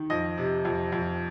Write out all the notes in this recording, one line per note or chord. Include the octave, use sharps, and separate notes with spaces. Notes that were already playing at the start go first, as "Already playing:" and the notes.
Already playing: D#3
F2 D#5
C3
F2
F2